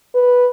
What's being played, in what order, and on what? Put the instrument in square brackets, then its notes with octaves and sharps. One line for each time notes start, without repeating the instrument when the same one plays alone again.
[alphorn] B4